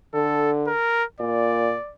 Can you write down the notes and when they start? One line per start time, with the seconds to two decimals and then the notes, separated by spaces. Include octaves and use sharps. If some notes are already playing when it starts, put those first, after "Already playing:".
0.14 D3 A4
0.67 A#4
1.20 A#2 D5